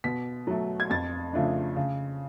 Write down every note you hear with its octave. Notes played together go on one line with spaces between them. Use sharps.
B2 B6
F#3 A3
G#6
F2 A6
C#3 F3 A3 D4
C#3